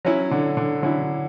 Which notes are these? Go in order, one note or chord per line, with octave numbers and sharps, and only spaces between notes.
F#3 C#4 E4
D3
D3
D3 F#3 C#4 E4